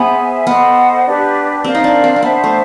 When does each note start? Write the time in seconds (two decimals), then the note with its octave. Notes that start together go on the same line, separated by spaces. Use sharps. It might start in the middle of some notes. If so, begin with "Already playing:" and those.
Already playing: B3 G#4 C5 E5 G#5
0.46 B3 A4 C5 D#5 F#5
1.05 D4 G4 B4
1.64 C4 A#4 D5 F5
1.75 D#4
1.84 D4
2.04 C4
2.16 C4
2.23 B3 C5 E5 A5
2.44 A3